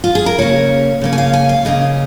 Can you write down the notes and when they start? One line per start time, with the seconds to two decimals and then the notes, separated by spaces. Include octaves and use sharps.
0.04 F4
0.15 G#4
0.26 A#4
0.38 C#3 A#3 C#4 C#5
1.01 C#3 A#3 C#4
1.13 G#5
1.18 F5
1.33 G#5
1.49 F5
1.65 C#3 A#3 C#4 D#5